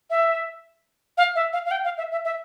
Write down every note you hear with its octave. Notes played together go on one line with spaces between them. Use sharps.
E5
F5
E5
F5
F5
G5
F5
E5
E5
E5